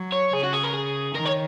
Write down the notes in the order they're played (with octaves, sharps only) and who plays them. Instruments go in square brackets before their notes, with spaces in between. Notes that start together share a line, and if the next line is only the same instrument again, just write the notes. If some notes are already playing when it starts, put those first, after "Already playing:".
Already playing: [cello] F#3
[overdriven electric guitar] C#5
[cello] C#3 [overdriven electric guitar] G#4
[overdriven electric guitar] F#4
G#4
A#4
G#4
[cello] D#3 [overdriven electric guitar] A#4
[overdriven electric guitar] C#5